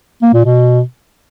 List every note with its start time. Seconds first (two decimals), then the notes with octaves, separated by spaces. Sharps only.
0.22 A#3
0.33 A#2
0.45 B2